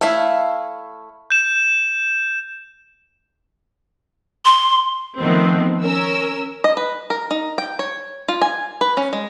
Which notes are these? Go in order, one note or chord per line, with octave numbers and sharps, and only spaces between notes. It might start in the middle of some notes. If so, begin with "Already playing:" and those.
A3 E4 C#5 E5 F5
G6 E7
C6
D#3 F3 A3 B3 C4
C#4 A#4 E6
D#5
B4
A#4
D#4
G5
C#5
F4
G#5
B4
C#4
G#3